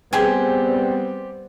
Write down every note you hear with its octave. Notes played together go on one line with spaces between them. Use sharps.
G3 B3 C4 G4 G#4 C5 G#5